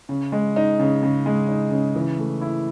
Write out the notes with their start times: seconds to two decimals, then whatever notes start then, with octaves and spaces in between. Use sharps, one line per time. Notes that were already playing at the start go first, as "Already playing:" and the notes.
0.09 C#3
0.32 G#3
0.56 D#4
0.80 C#3
1.03 C#3
1.26 G#3
1.48 D#4
1.71 C#3
1.95 E3
2.18 A3
2.41 E4